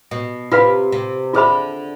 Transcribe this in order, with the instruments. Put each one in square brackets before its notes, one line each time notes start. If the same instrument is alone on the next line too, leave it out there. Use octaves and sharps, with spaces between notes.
[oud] B2
[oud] C3 [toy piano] F4 B4 F5 B5
[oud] C3
[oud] D3 [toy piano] F4 G#4 C5 E5 B5